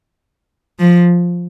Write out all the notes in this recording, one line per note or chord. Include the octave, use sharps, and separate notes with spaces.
F3